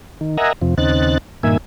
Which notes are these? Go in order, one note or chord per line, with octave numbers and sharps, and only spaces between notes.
D#3
A#4 D#5 E5 F#5 G#5 A#5
F2 C3 F3
D#2 C#3 C4 D#4 F#6 A6
G2 A#2 D#3 A#3 E5 G#5